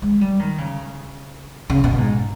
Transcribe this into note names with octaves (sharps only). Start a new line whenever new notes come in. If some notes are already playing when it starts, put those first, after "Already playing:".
G#3
G3
D#3
C#3
C#3
B2
G#2